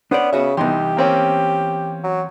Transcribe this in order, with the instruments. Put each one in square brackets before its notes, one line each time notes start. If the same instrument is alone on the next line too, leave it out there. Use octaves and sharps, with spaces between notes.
[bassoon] B3 [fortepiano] C#4 [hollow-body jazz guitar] D4 C5 D5
[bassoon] C#3 [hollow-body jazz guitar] B3 F#4 E5
[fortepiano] C2 D#4 C6 [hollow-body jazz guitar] E3 B3 [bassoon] G4
[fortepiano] A#3 C4 C#4
[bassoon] F#3